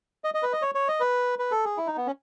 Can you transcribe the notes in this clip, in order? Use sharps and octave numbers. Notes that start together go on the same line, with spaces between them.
D#5
D#5
B4
D#5
C#5
C#5
D#5
B4
B4
A4
G#4
E4
D#4
B3
C#4